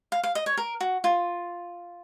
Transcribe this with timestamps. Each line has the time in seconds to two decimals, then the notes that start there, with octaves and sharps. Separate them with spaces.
0.12 F5
0.23 F5
0.35 D#5
0.46 C#5
0.57 A#4
0.81 F#4
1.04 F4